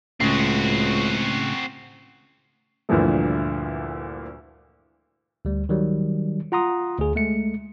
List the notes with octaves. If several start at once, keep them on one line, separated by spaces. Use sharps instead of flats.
C#2 A2 C#3 C4 F#4
D2 G2 A#2 E3 F3 A3
D2 G3
D#3 F#3 G3
F4 F#5 A#5 C6 D#6
D2 G#4
G#3 A3 C#7